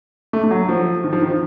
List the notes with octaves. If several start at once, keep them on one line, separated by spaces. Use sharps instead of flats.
A3
A3
F#3
F3
D#3
F3
D#3
F3